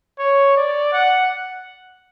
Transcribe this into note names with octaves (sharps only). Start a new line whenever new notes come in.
C#5
D5
F#5